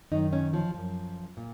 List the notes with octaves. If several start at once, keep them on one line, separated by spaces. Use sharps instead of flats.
F#2 D#3 D#4
C#4
F3
F#2 F3
A#2